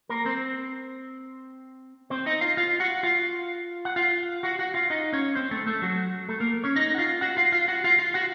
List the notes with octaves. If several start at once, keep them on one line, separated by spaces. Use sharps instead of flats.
A#3 A#4
C4 C5
C4 C5
D#4 D#5
F4 F5
F4 F5
F#4 F#5
F4 F5
F#5
F4 F5
F#4 F#5
F#4 F#5
F4 F5
D#4 D#5
C#4 C#5
C4 C5
A3 A4
A3 A4
F#3 F#4
A3 A4
A#3 A#4
C#4 C#5
D#4 D#5
F#5
F4 F5
F#4 F#5
F4 F5
F4 F5
F#4 F#5
F4 F5
F4 F5
F#4 F#5